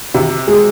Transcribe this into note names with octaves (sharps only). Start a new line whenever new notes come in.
C3
G#3